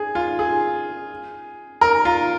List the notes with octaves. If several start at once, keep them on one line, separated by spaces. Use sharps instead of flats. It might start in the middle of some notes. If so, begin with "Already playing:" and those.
Already playing: G#4
F4
G#4
A#4
F4